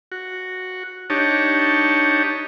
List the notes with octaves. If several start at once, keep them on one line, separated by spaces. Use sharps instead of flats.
F#4
D4 D#4 G4 C#5 A5